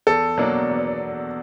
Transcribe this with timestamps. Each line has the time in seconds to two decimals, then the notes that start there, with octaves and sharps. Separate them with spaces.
0.07 E2 A4
0.37 B2 F#3 A#3 D4
0.69 E2